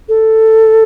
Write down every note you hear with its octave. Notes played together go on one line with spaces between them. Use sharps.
A4